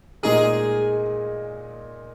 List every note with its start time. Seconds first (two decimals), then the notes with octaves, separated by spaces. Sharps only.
0.23 A#2 G#3 D#4 G#4 A#4